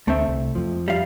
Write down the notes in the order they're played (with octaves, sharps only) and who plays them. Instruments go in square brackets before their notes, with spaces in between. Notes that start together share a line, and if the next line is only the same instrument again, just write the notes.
[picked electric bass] D2 [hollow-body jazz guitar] A3 C4 E5
[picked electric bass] C2
F2 F3
[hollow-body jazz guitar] G3 F5